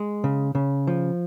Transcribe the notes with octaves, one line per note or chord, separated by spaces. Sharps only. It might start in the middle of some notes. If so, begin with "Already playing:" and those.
Already playing: G#3
C#3
C#3
F3